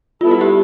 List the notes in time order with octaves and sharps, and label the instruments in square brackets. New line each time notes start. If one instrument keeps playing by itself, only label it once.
[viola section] G3 B3 E4 A4 [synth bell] F4
[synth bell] F#4
G4